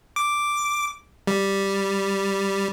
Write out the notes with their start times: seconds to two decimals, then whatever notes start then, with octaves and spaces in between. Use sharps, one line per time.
0.16 D6
1.27 G3